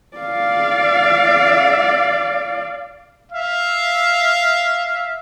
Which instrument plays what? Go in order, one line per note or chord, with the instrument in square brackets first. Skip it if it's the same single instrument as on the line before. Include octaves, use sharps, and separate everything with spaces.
[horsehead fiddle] D5 F5
[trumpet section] E5 F5